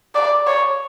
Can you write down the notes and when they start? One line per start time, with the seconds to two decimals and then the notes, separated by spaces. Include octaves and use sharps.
0.15 D5
0.47 C#5